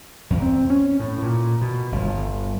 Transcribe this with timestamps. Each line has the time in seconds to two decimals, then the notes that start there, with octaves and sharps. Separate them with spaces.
0.30 E2
0.42 C4
0.70 C#4
1.00 A2
1.22 A#2
1.62 B2
1.92 G1